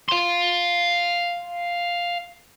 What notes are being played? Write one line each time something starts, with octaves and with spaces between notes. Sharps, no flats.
F5 C6